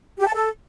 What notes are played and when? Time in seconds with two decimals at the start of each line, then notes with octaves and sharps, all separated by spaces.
0.19 G4
0.26 A5
0.34 A4